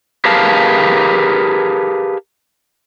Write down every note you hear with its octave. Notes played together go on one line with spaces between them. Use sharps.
G4 G#4 A#4 B4 F5 A5